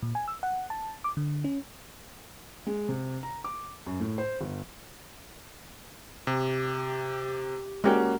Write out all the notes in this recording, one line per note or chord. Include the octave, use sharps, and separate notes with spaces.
A#2
G#5
E6
F#5
A5
D6
D3
C#4
G#3
C3
A#5
D6
F#2
A2
C5
G1
C3 G4
G#3 A#3 C#4 F#4 G4